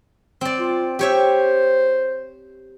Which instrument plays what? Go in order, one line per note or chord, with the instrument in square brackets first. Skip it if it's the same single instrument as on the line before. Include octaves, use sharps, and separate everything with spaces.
[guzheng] C4 D5
[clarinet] F4
[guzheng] G4 C#5 E5 [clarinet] C5